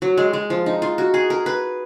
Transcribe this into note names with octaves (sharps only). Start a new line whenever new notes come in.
F#3
G#3
G#3
F3
D#4
F4
F#4
G#4
A#4
B4